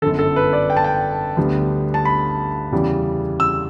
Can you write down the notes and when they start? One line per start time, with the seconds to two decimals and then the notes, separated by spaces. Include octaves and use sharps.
0.02 G1 F#2 D3 A4
0.19 A4
0.36 B4
0.53 D5
0.70 G5
0.77 A5
0.84 G5
1.37 D2 D3 G3 B3
1.94 A5
2.05 B5
2.72 E2 C#3 E3 G3
3.40 E6